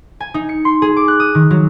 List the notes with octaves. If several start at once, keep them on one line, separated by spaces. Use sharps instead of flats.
G#5
D#4
C#7
C6
G#4
D6
F#6
D#6
D#3
F#3